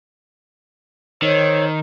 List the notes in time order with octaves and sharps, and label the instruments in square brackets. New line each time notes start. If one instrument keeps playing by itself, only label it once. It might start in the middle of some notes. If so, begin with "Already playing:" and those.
[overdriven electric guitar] D#3 [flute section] C5 C#5 E6